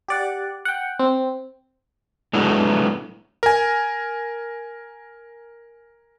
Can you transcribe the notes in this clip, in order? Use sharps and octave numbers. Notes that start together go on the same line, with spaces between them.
G4 D5 F#5
F#5 G5
C4
F#3 G#3 A3 B3 D4 E4
A#4 G#5